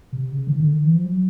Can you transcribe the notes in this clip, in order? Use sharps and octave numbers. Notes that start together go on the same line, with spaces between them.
C3
C#3
D#3
D3
D#3
E3
F3
F#3